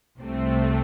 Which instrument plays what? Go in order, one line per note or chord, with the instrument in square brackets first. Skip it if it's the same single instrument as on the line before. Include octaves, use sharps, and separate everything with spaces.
[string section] C2 C3 A3 C4